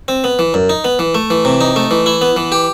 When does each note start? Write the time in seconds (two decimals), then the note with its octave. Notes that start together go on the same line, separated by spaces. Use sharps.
0.08 C4
0.24 B3
0.39 E3
0.54 F#2
0.69 D#4
0.84 B3
0.99 E3
1.15 A3
1.30 E3
1.45 C3
1.61 D#4
1.76 A3
1.91 E3
2.06 E4
2.21 B3
2.37 E3
2.52 G4